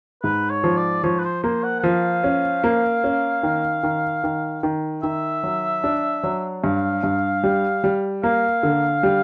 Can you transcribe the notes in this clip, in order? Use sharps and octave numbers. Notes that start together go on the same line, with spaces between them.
G#2 B4
C#5
F3
D5
F3 C#5
B4
C5
A#3 C5
F#5
F#5
F3 F5
C#4
A#3
C#4
D#3
D#3
D#3
D#3
D#3 E5
F#3
D4
F#3
G2 F5
G2
G3
G3
A#3 F5
D3
G3